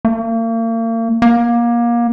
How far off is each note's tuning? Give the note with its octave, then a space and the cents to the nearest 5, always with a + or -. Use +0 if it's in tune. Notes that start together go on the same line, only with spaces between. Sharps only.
A#3 -40
A#3 +25